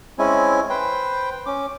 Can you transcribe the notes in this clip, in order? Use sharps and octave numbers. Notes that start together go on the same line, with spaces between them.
G#3 C4 C#4 E4 G#5
B4 C5 G5
C#4 D6